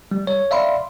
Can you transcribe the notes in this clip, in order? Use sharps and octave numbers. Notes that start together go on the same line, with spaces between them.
G3
C#5
D5 E5 F5 B5 C6